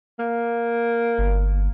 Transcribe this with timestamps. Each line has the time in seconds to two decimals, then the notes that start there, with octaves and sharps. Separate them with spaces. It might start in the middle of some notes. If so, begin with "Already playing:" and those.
0.19 A#3
1.18 G1